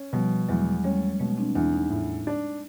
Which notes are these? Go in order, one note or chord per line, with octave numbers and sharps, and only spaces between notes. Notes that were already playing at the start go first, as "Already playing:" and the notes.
Already playing: C#4
B2 F3 G3
E2 F#3 G#3
G3 A3 C#4
B2 G#3 A#3
C4 D4
E2 D4 E4
C#4 D#4
A2
D4